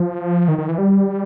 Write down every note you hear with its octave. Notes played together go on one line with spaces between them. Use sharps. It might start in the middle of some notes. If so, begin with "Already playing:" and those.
Already playing: F3
D#3
D#3
E3
G3